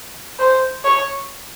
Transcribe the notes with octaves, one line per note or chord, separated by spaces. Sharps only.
C5
C#5